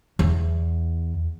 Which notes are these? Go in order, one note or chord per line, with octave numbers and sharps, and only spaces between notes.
E2